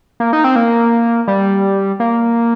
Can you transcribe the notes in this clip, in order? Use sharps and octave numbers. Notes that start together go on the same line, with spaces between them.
A#3
D#4
C4
A#3
G3
A#3